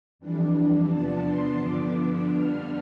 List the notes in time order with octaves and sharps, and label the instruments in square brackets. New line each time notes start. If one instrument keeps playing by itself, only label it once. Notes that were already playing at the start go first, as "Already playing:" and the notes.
[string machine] F2 E3 G3 D4
E2 C3 F3 B3 D4 A5
C6
G2 D3 F3 B3 D4 D6
D6
F2 D3 G3 B3 D4 F6